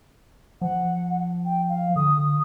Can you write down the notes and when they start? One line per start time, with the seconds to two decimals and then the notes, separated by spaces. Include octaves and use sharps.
0.61 F3 F#5
1.45 G5
1.69 F5
1.96 D3 D#6